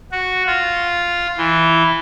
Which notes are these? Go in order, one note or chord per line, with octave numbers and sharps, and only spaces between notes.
F#4
F4
E3